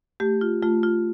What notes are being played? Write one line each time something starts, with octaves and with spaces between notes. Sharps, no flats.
A3 G4
F4
A3 F4
F4